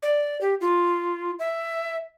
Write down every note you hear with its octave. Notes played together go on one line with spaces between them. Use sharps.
D5
G4
F4
E5